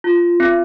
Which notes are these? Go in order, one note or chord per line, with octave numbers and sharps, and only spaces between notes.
F4
C4